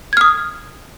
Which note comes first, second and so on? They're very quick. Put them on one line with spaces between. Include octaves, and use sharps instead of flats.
G#6 F6 D#6